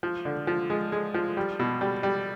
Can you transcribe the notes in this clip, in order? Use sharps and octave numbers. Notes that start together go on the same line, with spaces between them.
F3
D3
F3
G#3
G#3
F3
G3
B2
G3
G3